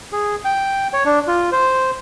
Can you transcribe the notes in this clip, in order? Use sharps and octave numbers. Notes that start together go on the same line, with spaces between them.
G#4
G5
C#5
D4
F4
C5